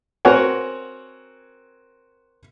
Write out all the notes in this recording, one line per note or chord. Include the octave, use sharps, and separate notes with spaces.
C4 F#4 A#4 C#5 F#5 G#5